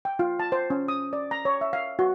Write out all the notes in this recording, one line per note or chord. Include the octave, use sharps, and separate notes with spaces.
G5
F4
A5
C5
C#4
D#6
D5
A#5
C#5
E5
F5
F#4